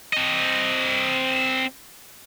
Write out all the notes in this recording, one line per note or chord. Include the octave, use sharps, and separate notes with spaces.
C4 D#5